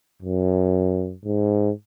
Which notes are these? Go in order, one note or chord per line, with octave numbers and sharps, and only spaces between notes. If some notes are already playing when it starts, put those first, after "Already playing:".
F#2
G#2